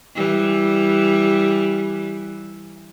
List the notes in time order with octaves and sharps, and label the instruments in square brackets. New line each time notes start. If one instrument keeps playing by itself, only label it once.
[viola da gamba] E3 G3